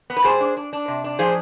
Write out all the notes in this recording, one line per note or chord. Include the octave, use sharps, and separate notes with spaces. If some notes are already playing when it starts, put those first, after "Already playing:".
B3
B4
G3 G#4 C5
D4
D4
D4
C3
D4
F3 G#4 C5